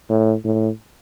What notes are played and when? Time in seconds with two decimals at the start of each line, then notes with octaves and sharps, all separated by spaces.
0.10 A2
0.45 A2